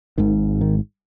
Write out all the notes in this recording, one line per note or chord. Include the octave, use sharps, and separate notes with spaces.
G#1 G#2 D#3
D#3